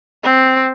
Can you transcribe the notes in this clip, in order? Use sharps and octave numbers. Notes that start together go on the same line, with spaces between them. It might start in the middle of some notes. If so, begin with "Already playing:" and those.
C4